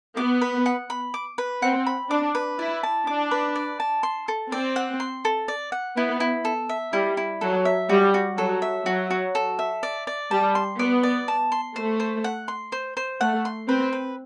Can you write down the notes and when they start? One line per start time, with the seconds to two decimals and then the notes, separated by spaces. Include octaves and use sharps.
0.17 B3 D6
0.41 B4
0.66 F#5
0.90 B5
1.14 D6
1.38 B4
1.62 C4 F#5
1.86 B5
2.10 D4 D6
2.35 B4
2.59 E4 D5
2.83 A5
3.07 D4 D6
3.31 B4
3.56 D5
3.80 A5
4.03 C6
4.28 A4
4.52 C4 D5
4.76 F#5
5.00 C6
5.25 A4
5.48 D5
5.72 F#5
5.97 B3 E4
6.20 E4
6.45 A4
6.69 E5
6.93 G3 E4
7.17 E4
7.41 F#3 A4
7.65 E5
7.89 G3 F#4
8.14 F#4
8.38 F#3 A4
8.62 E5
8.86 F#3 F#4
9.10 F#4
9.35 A4
9.59 E5
9.83 D5
10.07 D5
10.31 G3 A5
10.55 C6
10.79 B3 D5
11.03 D5
11.28 A5
11.52 C6
11.76 A3 C5
12.00 C5
12.24 F#5
12.48 C6
12.72 C5
12.97 C5
13.21 A3 F#5
13.45 C6
13.69 C4 B4
13.93 B4